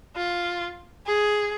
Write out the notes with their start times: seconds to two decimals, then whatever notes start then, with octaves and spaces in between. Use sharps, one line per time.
0.16 F4
1.07 G#4